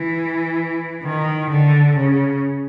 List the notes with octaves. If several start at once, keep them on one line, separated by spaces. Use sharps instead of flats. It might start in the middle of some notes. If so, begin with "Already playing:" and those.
Already playing: E3
D#3
D3
C#3